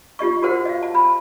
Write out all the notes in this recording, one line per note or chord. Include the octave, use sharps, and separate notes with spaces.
F4 G4 D#5 C#6
F#4 G4 A#4 C5 F#5
D#5 F5
A5
B5